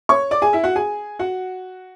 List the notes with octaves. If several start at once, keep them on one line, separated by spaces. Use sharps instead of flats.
C#5 C#6
D5 D6
G#4 G#5
E4 E5
F#4 F#5
G#4 G#5
F#4 F#5